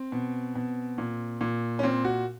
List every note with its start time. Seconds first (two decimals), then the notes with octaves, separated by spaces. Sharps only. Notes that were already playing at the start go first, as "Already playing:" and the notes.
Already playing: C4
0.12 B2
0.55 B2
0.98 A#2
1.41 A#2
1.79 C#4
1.83 A#2 C4
2.05 F#4